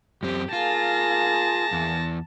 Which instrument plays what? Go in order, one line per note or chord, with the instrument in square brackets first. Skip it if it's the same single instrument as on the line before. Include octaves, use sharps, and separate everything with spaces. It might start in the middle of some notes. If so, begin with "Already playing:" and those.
[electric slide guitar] F#2 C4 [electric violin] G4
[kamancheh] A#3 G#4 [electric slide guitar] F4 [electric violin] A5 A#6
[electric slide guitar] E2